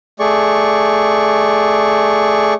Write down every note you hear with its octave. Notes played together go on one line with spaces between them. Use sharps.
A3 G#4 D5 C#6